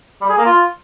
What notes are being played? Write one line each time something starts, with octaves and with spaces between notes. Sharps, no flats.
G3
G#4
A#3
F4